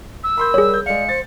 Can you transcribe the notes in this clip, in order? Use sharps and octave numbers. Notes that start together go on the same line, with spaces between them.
E6
A#4 B5 C6 G6
G3 G#4 C#5
G6
G#3 D5 F5 C#7
C5 A6